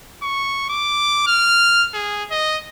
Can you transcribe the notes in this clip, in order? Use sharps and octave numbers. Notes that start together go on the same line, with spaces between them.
C#6
D6
F6
G#4
D#5